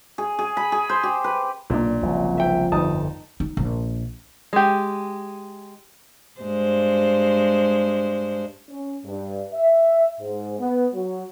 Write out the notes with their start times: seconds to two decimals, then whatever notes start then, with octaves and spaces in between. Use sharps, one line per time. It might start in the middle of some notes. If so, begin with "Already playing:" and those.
0.18 G#4
0.39 G#4
0.57 B5
0.72 G#4
0.89 C5
1.03 G4
1.24 B4
1.70 B1 A#2 D4
2.02 F#1 C2 F#2 F3
2.38 E5 G5
2.72 G1 F2 D#4 A5 D#6
3.40 D#4
3.57 A#1
4.53 G#3 G4
6.41 G2 G#3 C5
8.69 C#4
9.06 G2
9.53 E5
10.20 G#2
10.59 B3
10.94 F#3